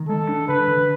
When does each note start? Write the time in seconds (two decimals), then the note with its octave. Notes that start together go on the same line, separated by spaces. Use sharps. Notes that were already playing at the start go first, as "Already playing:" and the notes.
Already playing: D#3
0.08 G#3 A4
0.29 D4
0.48 D3 B4
0.68 D3